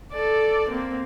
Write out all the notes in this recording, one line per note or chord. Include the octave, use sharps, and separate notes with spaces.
A4 D5
A#3 C4